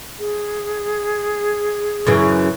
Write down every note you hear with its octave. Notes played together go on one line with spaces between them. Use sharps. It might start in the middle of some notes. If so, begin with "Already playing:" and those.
G#4
F#2 C#3 E3